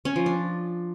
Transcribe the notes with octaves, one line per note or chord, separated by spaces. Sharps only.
C#4
F3
D4